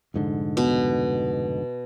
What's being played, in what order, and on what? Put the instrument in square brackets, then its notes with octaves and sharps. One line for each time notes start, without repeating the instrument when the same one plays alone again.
[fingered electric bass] F1 G#2 D3
[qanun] B2